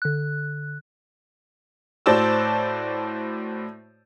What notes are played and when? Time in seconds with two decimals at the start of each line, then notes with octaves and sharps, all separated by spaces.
0.02 D3 F#6
2.06 A2 F#4 C5 D5 A5 E6